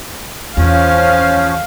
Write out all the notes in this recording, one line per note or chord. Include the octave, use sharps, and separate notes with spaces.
E2 F3 C#4 F5